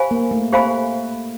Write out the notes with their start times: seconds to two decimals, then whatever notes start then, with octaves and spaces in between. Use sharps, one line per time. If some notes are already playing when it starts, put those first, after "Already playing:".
Already playing: G4 C5 F5 G#5 B5
0.11 A#3
0.31 A3
0.52 A3 G4 C5 F5 G#5 B5